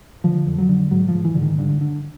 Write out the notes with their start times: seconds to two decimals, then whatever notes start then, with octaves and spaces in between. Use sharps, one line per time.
0.24 D3 F3
0.47 F2
0.58 F#3
0.69 D3
0.91 G#2 F#3
1.08 F3
1.14 G#2
1.25 E3
1.35 G#2 D3
1.42 D#3
1.58 G2 D3
1.81 D3